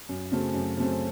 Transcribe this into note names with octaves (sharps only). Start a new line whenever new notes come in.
F#2
C#3 F#3 A3 C4
F#2
C#3 F#3 A3 C4